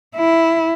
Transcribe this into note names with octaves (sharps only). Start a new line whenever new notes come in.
E4